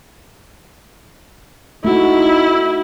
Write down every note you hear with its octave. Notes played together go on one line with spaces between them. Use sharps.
A3 D#4 E4 F#4